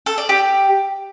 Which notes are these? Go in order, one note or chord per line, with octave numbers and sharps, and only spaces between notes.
A4
D5
G4